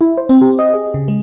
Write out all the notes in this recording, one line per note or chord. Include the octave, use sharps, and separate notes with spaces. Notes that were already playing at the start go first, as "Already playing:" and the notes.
E4
C5
C4
G4
D#5
G#4
C#3
G#3